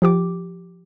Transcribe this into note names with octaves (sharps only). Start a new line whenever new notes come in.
F3 G4 D6